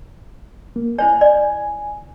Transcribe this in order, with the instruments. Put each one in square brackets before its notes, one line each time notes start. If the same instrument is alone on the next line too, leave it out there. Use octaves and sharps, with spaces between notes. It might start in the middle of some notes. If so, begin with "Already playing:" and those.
[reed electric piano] A#3
[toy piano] E4 C5 C#5 [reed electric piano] G#5
[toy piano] D5